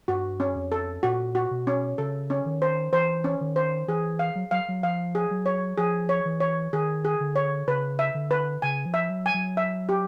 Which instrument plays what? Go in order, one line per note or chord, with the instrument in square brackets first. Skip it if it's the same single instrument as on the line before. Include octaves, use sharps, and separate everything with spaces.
[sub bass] G2 [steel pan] F#4
[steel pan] C#4
[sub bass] F#2
F2
[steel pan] A4
[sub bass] A#2 [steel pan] F#4
[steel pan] F#4
[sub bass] B2
[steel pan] C#4
[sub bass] C#3 [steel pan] A4
[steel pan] C#4
[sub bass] D#3
[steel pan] C5
[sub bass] E3 [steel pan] C5
[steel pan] C#4
[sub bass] D#3
[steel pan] C5
[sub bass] E3 [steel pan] G#4
[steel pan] F5
[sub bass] F#3
[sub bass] F#3 [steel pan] F5
[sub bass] F#3
[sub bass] F3 [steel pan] F5
[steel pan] G#4
[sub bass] F#3
[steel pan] C#5
[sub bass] F3 [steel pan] G#4
[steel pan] C#5
[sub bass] E3
[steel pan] C#5
[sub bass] D#3 [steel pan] G#4
[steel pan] G#4
[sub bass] D3
[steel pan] C#5
[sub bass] C#3 [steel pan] B4
[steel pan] E5
[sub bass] D3
[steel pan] B4
[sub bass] C#3 [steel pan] G#5
[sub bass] F3
[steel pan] E5
[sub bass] F#3
[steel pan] G#5
[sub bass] F#3
[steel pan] E5
G4